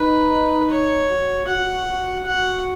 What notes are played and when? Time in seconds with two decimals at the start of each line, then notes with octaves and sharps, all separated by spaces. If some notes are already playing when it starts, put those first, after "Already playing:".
Already playing: D#4 B4
0.70 C#5
1.09 F#4
1.47 F#4 F#5
1.86 F#4
2.26 F#4 F#5